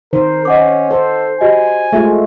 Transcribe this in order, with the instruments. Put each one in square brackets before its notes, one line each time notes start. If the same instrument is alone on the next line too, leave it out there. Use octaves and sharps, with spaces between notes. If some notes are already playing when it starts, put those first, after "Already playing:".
[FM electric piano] D#3 [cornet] A#4 [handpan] C5
[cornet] C#4 [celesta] D#5 F#5 D6
[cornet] A4 [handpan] C5
[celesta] F#4 G4 D#5 [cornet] G#5
[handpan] G#3 A3 F4 [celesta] G4 G#4 E5